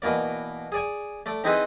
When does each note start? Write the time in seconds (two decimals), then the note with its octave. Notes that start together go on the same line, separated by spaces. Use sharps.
0.02 B2 E3 A#3 D5
0.72 G#4 D5 G#5
1.26 A3 D5
1.44 C4 D#4 E4 G#4 B4 C5